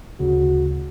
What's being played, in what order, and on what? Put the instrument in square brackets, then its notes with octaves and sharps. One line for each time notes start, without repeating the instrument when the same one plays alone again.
[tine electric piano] D2 C#3 [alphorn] F#4